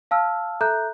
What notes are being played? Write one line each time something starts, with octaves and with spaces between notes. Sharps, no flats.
F5 A5 E6 F6
A4 E5 A#5 F#6 G6